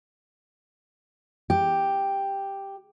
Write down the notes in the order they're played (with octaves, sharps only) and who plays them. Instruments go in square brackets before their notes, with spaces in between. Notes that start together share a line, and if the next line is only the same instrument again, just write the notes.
[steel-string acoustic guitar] G4